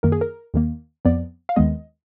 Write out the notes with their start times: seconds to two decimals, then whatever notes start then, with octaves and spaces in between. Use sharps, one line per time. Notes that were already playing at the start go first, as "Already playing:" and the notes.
0.03 F#2 D#3 A#3 A#4
0.12 G#4
0.21 A#4
0.54 D#2 D#3 A#3
1.05 F2 F3 B3 D5
1.49 F5
1.56 D#2 D#3 G#3 B3 D#5